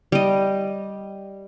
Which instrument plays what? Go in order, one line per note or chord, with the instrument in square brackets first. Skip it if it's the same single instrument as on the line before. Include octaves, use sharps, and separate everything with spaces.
[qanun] G3 D#5